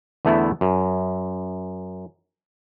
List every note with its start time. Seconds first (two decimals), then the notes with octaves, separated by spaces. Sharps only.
0.25 E2 D3 A3 B3 E4
0.61 F#2